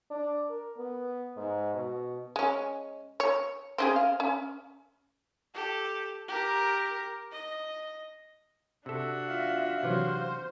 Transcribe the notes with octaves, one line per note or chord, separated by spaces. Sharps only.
D4
A#4
B3
G#2
B2
G#3 C#4
C#5
C4 C#4 G#4
F5
C#4
G4 A4
G4 A#4
D#5
C3 D4 F#4 A4 E5
F4 E5 F5
C3 E3 F#3 C5